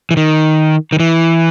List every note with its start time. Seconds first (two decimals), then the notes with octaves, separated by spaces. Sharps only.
0.11 E3
0.17 D#3
0.92 D#3
1.00 E3